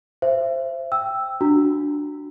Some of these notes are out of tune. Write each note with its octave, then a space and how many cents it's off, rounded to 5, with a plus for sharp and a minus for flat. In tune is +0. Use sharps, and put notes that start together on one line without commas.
C5 +0 E5 +35
G5 +0 E6 +0
D4 +0 F#4 +0 A#5 -15